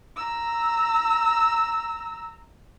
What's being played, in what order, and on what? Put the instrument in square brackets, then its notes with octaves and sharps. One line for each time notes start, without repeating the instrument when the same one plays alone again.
[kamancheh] A#5 E6